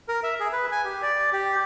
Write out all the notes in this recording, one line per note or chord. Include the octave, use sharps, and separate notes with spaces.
A#4
E5
G#4
B4
G#5
G4
D5
G4